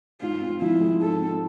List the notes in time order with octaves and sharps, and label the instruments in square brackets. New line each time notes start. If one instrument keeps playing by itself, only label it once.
[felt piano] G#2 [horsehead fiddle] F4
[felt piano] C4
[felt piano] F3 [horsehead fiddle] E4
[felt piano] G#3
[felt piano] G#2 [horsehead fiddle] A4
[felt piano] C4